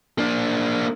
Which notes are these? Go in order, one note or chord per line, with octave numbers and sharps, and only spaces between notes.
A#3 D4